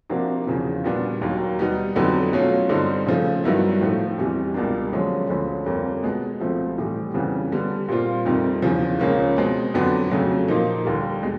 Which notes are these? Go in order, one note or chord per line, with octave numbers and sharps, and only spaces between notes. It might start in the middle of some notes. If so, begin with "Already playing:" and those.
C3 F3 A#3 D4 F#4
E2 C#3 F3
A#2 G3 B3 D4 F#4
D#2 D#3 F#3 A#3
B2 G3 B3 D#4
F2 D3 F#3 B3 D#4
B2 F#3 A3 C#4 F4
G2 D3 G3 C4 D#4
C#3 F3 A3
G2 D#3 F#3 B3 E4
A2 F3 A3
E2 C3 E3 G3
C#2 B2 G3 A#3 D4
F#2 D3 F3 G#3 C#4
D2 D3 F3 G#3 C#4
F2 D3 G3 A#3 C#4
B2 G#3 B3
C#2 C3 F3 A3 C4
A2 E3 G3
F2 C#3 E3 G3 B3
D3 G3 B3
A#2 G3 C4 F4
F2 C3 D#3 G3
E2 C#3 F3
C#2 C#3 F3 A#3 C#4
B2 G#3 C4
F2 D3 F#3 B3 D4
F2 C#3 F#3 A3
A#2 F3 A#3 D#4
D#2 D3 G3
B2 G#3